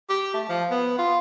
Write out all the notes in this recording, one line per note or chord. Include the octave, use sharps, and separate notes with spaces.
G4
A3
F3
B3
F4